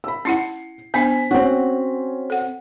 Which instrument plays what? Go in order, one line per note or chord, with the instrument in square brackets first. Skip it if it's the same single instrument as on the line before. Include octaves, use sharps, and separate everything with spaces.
[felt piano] B5 E6
[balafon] C#4 E4 F#5 [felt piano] C7 C#7
[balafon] B3 D4 [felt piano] C5 G#5 B6
[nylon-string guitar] C4 F#4 [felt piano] C#4
[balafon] A4 F#5